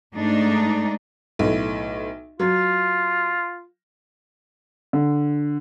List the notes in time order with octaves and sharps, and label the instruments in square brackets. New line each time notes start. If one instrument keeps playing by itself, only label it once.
[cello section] G#2 A3 D4 D#4
[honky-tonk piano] B1 A2
[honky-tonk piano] F#3 [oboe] F4
[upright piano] D3